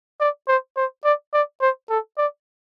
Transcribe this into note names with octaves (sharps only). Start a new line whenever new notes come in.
D5
C5
C5
D5
D5
C5
A4
D5